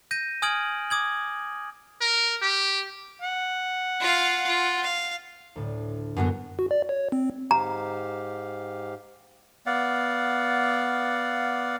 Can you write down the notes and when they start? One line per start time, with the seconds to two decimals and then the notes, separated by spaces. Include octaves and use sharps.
0.11 G6 A#6 D#7
0.42 G#5 D#6 F6 G#6 D7 F#7
0.90 D6 D#6 G#6 F#7
2.01 A#4
2.42 G4
3.22 F#5
4.00 F4 F5
4.47 F4
4.82 F5
5.56 D2 A2
6.17 F#2 D3 B3 F#4
6.59 F#4
6.71 D5
6.89 C#5
7.12 C4
7.51 G#2 G4 F5 A#5
9.66 B3 D5 F5 F#5